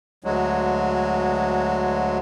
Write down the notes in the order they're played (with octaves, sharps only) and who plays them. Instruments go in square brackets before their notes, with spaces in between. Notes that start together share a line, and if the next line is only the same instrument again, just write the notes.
[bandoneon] D2 F#3 G#3